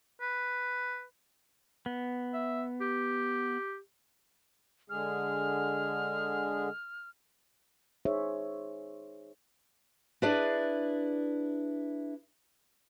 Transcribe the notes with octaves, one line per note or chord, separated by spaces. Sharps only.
B4
B3
E5
G4
D3 G#3 G#4 F6
D#4 G#4 C5 C#5 E5
D4 E4 G#4 B4 D5